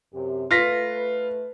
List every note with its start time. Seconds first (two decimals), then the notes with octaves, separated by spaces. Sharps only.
0.13 F#2 C3 G4
0.51 A3 F4 B4 A#6 B6